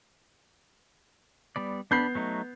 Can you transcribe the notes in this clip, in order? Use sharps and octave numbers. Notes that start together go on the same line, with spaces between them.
G3 B3 D5
B3 D4 B5 G6 C7
F#3 A3 D#4